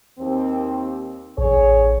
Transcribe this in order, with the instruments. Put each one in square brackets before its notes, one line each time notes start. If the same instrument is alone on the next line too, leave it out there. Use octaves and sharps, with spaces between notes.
[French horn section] D#2 C4
[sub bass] A1 [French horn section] D3 G#4 C#5